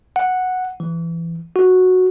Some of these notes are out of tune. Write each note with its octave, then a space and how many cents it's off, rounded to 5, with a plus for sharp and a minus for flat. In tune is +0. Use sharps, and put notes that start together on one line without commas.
F#5 -5
E3 +20
F#4 -5